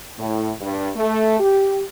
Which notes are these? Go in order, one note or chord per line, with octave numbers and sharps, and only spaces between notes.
A2
G2
A3
G4